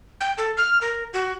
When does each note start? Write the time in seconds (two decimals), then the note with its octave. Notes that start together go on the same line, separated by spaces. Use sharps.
0.21 G5
0.38 A4
0.57 F6
0.81 A#4
1.13 F#4